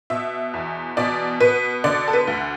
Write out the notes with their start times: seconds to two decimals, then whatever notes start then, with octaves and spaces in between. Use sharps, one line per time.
0.10 B2 E5
0.53 E2
0.97 B2 D5
1.40 B2 B4
1.84 D3 D5
2.08 A4
2.13 B4
2.27 D2